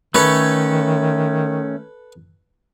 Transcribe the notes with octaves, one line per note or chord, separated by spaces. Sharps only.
D#3 A3 C#4 A4 B4 C#5